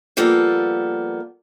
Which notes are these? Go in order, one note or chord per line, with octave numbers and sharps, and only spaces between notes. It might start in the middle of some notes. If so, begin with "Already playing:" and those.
F3 G3 A#3 B3 A4